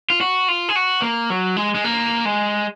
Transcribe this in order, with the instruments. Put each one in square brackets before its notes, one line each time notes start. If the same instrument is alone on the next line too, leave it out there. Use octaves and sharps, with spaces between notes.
[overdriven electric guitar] F4
F#4
F4
G#4
F#4
A#3
F#3
G#3
G#3
A#3
G#3